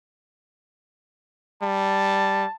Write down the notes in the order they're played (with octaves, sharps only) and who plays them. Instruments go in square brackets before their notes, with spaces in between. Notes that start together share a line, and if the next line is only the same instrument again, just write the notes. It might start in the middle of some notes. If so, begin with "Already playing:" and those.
[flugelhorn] G3 [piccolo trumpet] A5